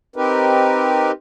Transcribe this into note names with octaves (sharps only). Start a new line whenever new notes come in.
C4 D#4 G4 A#4 B4